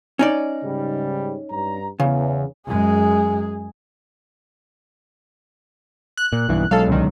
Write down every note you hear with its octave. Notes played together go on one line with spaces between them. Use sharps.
C#4 D#4 D5
G#2 C#3 G3
G2 A#5
E2 C#3
F#2 G#3 G#4
F#6
A#2
B1 G2 E3
B1 F#3 G#3 A4 F5
C#2 D3 D#3